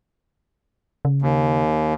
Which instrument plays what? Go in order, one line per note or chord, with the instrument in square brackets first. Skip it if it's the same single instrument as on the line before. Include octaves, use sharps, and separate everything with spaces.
[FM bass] C#3
[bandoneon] D#2